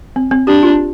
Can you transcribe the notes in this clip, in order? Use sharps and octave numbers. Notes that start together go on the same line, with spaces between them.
C4
C4
D4 G4
F4